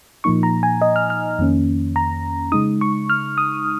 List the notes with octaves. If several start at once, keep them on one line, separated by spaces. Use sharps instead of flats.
A#2 F3 A#3 D#4 C#6
A#5
G#5
D#5
F6
F6
F2 D#3 A#3 C#4
A#5
C#3 G#3 D#4 D#6
C#6
F6
D#6